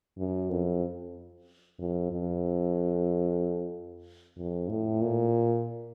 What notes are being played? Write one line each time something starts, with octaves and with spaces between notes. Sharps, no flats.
F#2
F2
F2
F2
F2
A2
A#2